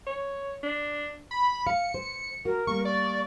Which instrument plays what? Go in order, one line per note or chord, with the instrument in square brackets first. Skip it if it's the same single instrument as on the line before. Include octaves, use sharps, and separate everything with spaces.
[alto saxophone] C#5
D4
[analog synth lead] B5
[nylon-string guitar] F5 [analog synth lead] C#7
[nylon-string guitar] C5
[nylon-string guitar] F#4 [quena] A#4
[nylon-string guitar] G3 A#3 [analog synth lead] C#6
[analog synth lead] D5 [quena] C#6